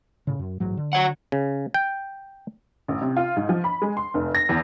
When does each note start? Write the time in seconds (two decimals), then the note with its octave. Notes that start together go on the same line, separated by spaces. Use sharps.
0.27 A2 C#3
0.39 F#2
0.60 A1 G#2 F#3
0.77 D3
0.93 F#4 C#5 F#5
1.32 C#3
1.74 G5
2.88 A1
3.02 C3
3.16 F4
3.36 G#2
3.49 F3
3.64 B5
3.82 G#3
3.97 C6
4.14 F1
4.35 A#6
4.49 E2